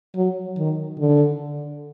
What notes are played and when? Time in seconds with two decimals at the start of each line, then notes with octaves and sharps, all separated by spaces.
0.16 F#3
0.58 D#3
0.98 D3